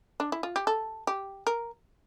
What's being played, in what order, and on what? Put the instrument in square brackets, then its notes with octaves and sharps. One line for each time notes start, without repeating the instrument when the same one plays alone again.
[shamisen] D4
E4
F4
G4
A4
G4
A#4